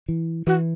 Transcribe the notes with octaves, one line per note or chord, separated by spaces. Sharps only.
E3
E3 F#4